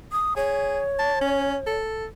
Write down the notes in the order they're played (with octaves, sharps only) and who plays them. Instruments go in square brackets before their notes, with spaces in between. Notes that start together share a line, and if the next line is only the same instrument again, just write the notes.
[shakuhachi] D#6
[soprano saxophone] G#4 [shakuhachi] C#5
[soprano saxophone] A5
C#4
A4